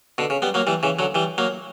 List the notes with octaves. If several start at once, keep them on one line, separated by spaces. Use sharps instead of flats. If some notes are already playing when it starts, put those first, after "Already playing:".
B2 D3
C#3
G3 B3
F#3 A#3
E3 G3
C#3 E3
D3 F#3
E3 G3
F#3 A#3